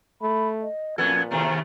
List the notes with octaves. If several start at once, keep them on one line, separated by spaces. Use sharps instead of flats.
A3 B5
D#5
F2 A#2 B3 A4 G#6
D#2 C3 A3 A#5